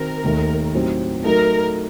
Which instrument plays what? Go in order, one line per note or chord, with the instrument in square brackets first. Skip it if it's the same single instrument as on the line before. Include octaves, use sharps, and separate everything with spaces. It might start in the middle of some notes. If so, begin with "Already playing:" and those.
Already playing: [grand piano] D#3 C4 F#4 [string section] A#4
[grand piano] D#2 D#3 A3
A2 F#3 C4 D#4 G4
[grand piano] F#3 A3 D#4 [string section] A#4